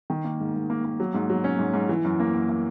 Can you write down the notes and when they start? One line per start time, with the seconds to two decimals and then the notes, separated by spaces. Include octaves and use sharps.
0.10 D#3
0.24 A#3
0.40 G#2
0.54 G#2
0.70 A#3
0.85 A#3
1.00 F#3
1.14 G#2
1.30 F#3
1.44 C#4
1.59 G#2
1.74 G#2
1.89 E3
2.05 F#2
2.20 A#3
2.34 F#2
2.49 A#3